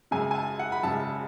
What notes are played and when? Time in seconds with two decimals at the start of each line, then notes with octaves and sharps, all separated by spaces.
0.11 F#2 C#3 G#3 G#5
0.31 G#5
0.35 A5
0.59 F#5
0.72 B5
0.83 F#2 C#3 G#3 A5